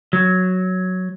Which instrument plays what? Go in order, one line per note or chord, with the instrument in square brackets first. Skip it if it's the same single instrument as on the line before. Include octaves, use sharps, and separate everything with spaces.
[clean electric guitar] F#3